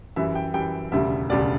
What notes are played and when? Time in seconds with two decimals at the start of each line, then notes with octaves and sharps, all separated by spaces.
0.16 F#2 E3 G3 E5
0.35 G5
0.54 F#2 E3 G3 G5
0.92 E1 D2 C#3 G3 E5
1.29 E1 D2 C#3 G3 D5